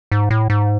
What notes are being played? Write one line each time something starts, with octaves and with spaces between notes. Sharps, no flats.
G#2
A2
G#2